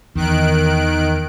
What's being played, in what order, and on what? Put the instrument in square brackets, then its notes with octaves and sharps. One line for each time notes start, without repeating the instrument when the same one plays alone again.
[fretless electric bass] E2 [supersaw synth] D#3 F#6 D7